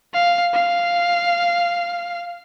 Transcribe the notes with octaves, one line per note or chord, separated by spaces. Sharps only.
F5
F5